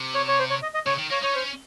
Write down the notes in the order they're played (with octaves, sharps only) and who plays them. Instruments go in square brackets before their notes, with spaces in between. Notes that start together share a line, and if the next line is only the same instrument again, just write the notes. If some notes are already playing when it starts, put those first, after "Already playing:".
Already playing: [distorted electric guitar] C3
[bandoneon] C#5
C#5
C5
C#5
D#5
D#5
[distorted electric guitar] C#3 [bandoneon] C#5
[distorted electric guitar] D#3
[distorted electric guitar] A#3 [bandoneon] C#5
[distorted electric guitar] D#4 [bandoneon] C#5
[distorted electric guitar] C#4 [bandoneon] C5